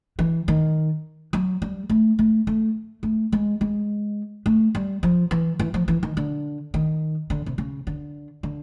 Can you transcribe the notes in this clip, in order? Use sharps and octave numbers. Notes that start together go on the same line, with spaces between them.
E3
D#3
F#3
G3
A3
A3
A3
A3
G#3
G#3
A3
G3
F3
E3
E3
F3
E3
D#3
D3
D#3
D3
C3
C#3
D3
D3